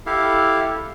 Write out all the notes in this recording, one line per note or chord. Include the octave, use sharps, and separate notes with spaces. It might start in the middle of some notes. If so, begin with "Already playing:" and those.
E4 G4 A4 F5